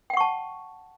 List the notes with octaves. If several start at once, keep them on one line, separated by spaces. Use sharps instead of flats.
F#5 G5 A5 C#6